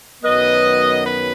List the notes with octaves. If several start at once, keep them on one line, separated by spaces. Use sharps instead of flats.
F#2 D#3 F#3 B3 B4 D#5
B4